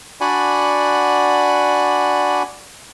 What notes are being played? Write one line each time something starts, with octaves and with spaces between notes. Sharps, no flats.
D4 F#4 D5 F#5 G#5 B5